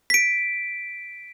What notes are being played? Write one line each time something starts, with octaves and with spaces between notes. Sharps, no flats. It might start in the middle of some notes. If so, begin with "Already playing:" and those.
B6 D7